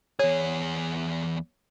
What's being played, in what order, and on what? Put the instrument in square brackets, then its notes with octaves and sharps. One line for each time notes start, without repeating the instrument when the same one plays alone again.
[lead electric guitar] E2 G#4 [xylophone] C#5